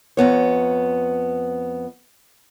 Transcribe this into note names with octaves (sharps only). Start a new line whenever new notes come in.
F2 A#2 B3 C#5